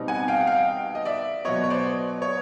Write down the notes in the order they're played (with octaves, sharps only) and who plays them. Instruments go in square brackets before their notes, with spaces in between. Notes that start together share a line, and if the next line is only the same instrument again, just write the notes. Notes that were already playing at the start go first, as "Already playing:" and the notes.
Already playing: [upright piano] B2 G3 C4 D#4
F#5 G#5
F5 G5
F#5
F5 G5
D#5
D5 E5
B2 F#3 B3 C#5 D#5
C#5
C5 D5
C#5